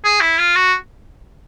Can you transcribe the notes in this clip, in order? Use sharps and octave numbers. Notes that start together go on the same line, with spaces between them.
G#4
E4
F4
F#4